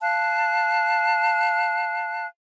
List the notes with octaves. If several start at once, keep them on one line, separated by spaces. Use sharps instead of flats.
F5 A5 F#6